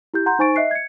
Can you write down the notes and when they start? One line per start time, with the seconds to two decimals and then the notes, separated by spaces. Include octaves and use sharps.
0.14 E4 G4 G6
0.26 F#5 A#5 C6 G6
0.39 D#4 C5 G#5 C#6 A6 D7
0.56 D#5 E5 F#6 C7
0.71 G#6 C#7